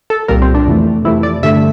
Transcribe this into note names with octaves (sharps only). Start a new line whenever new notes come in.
A4
C2 A#2 G3 A#4
C4
D4
F2 C3 E3 A3
F2 C3 E3 A3 E4
D5
G2 D3 A3 E5